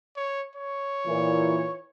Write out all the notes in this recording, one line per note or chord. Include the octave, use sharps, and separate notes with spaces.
C#5
C#5
A#2 E3